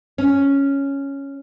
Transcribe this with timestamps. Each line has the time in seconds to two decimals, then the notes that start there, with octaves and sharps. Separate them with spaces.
0.18 C#4